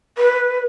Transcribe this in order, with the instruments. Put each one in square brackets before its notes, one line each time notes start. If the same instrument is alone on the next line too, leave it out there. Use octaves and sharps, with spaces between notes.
[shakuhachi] B4